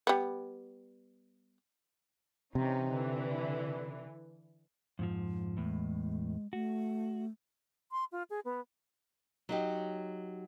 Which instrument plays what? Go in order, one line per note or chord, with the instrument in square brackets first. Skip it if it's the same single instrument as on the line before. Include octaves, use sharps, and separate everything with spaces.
[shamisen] G3 B3
[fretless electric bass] C3 [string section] E3 C#4 D#4
[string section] D3 E3
[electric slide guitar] F2 G#2 F3
[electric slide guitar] E2 A2 [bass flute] G#3
[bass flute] A3 [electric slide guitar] F#4
[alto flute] C6
F4
G#4
B3
[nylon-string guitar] F#3 D#4 G4